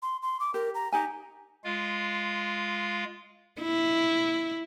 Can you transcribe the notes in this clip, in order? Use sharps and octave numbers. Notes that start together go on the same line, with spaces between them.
C6
C6
D6
G4 A#4
A#5
D#4 G4 G#5 A#5
G#3 F4 F5
E4